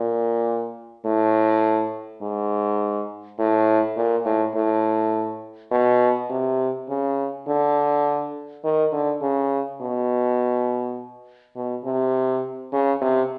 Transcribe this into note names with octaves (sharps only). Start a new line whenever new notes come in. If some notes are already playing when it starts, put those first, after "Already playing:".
Already playing: A#2
A2
G#2
A2
A#2
A2
A2
B2
C3
C#3
D3
D#3
D3
C#3
B2
B2
C3
C#3
C3